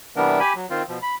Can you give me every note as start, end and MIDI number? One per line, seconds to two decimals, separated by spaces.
0.16 0.39 48
0.16 0.39 52
0.16 0.39 55
0.16 0.39 59
0.16 0.39 62
0.16 0.39 70
0.40 0.53 67
0.40 0.53 80
0.40 0.53 83
0.56 0.66 54
0.70 0.83 51
0.70 0.83 60
0.70 0.83 65
0.89 0.99 47
0.89 0.99 53
1.02 1.15 83